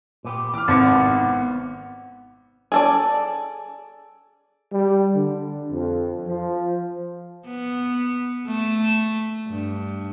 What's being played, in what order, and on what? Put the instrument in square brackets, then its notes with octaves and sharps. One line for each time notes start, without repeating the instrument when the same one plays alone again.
[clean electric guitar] A#2 B3 G4
[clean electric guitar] E3 [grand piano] D6 F6
[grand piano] G#1 F#5 C#7 [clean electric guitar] C3 E4 [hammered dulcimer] B3 [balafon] C4 D#4
[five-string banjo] G#4 A4 D5
[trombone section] G3
D3
F2
F3
[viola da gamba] B3
A3
G2